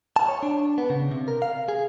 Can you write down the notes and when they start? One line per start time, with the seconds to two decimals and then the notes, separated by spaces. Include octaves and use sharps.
0.16 A5
0.29 C#5
0.43 D4
0.78 B3
0.90 C#3
1.11 C3
1.28 A#4
1.42 F5
1.68 G#4